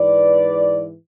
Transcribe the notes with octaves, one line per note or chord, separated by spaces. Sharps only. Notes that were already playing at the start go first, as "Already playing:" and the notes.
Already playing: G#2 E3 B4 D5